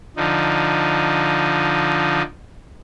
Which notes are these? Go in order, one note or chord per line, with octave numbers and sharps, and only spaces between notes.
D3 F3 D#4